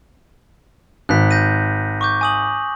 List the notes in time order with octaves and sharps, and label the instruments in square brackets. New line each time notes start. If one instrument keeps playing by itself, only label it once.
[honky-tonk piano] G#1 [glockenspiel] F#6 B6
[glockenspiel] G6 A#6 D#7
C#6 D6 G6
G#5 D#6 F#7